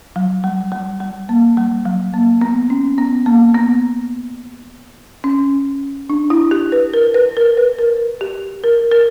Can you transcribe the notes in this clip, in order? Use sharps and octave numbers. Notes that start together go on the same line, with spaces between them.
F#3
G3
G3
G3
A#3
G3
F#3
A#3
B3
C#4
B3
A#3
B3
C#4
D4
E4
G4
B4
A#4
B4
A#4
B4
A#4
G4
A#4
A#4